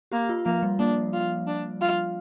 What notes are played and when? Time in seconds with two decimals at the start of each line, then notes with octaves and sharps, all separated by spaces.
0.12 A#3 G4
0.29 F4
0.45 F3 A#3
0.63 G3
0.79 A#3 D4
1.13 F4
1.47 D4
1.81 F4